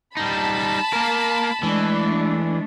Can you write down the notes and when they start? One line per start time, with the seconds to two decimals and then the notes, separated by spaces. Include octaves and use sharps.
0.17 G3 D#4 A5 B5
0.93 A#3 A#4
1.63 E3 G#3 A3 D4